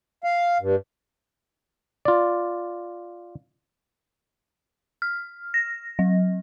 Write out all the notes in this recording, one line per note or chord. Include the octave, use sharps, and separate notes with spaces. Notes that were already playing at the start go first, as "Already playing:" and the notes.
F5
G2
F4 D5
F6
A#6
F#3